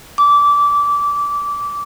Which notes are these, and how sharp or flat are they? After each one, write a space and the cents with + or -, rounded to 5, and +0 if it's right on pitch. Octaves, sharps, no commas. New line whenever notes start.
D6 -20